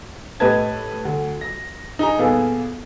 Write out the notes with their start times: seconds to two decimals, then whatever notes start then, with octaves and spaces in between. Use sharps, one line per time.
0.40 A2 G4 B4 D#5 A5 G#6
1.05 D2
1.41 A#6
1.99 D#4 G#4 A#5
2.18 A#2 A#3 B3 G#4 A4